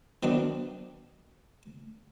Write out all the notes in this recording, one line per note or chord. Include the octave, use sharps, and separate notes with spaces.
D#3 F#3 B3 C4 D4